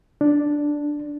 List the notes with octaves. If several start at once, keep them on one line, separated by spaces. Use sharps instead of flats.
D4